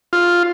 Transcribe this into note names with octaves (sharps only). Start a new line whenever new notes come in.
F4